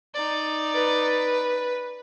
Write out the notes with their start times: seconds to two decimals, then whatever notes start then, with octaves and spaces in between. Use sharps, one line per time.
0.14 D#4 D5
0.75 B4